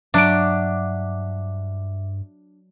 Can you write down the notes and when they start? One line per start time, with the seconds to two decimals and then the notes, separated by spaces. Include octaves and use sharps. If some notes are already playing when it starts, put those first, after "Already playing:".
0.14 G2 F#3 D4 E5 F#5 D6 D7